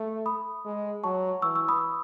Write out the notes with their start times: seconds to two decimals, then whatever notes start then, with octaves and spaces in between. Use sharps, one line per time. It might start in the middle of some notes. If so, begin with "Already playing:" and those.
Already playing: A3
0.26 B5 D#6
0.65 G#3
1.04 F#3 A5 C#6
1.42 E3 C#6 E6
1.56 C#6 E6
1.69 B5 D#6